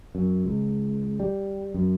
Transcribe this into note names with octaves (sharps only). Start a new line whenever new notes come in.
F#2
C#2
G3
F#2